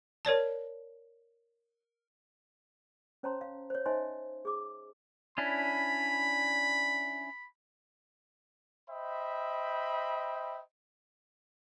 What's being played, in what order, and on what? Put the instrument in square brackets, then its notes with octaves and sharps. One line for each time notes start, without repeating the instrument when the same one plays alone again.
[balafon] A#4 C#5 D5 A5
[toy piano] C#4 C5 C#5 A5 A#5 C6
F5
C5 C#5
D#4 C5 D#5 E5 G#5 C6
G#4 D6
[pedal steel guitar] C#4 D4 E4 [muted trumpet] B5
[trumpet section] C5 D#5 E5 G5 B5